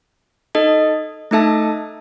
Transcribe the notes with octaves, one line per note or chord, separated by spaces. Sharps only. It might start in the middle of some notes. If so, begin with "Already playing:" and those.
D#4 A4 D#5
A3 D#4 A4 E5 A5